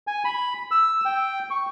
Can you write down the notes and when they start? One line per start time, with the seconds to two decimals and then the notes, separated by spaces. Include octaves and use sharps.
0.07 G#5
0.25 B5
0.71 E6
1.05 G5
1.50 C#6